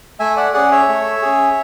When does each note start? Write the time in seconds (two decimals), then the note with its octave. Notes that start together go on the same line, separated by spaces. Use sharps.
0.20 A3 E5 G#5
0.37 D5 F#5
0.53 C#4 G#4 D5 F#5
0.72 C#5 E5
0.88 A3
1.22 C#4 G#4